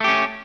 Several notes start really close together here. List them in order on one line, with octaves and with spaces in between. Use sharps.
A3 G4 C#4